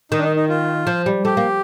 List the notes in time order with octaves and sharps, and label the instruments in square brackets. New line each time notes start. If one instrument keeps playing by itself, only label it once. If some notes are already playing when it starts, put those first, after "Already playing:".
[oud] D#3 [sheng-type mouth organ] D#4
[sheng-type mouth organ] D4
D#4
D#4
F4
[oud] F3
G3
[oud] A3 [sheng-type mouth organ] G4
[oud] A#3